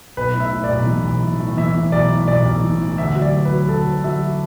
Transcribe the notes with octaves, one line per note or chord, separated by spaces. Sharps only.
B1 B4
A2
E5
A2
D5
B1
E3
B1
E3
A2
E3 E5
E3
B1 D5
A2
B1 D5
B1
E3
A2
D2 E5
F#3
D5
D2
B4
F#3
D2 A4
D2
F#3 E5